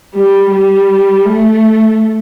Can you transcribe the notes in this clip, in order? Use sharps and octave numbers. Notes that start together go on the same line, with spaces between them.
G3
G3
A3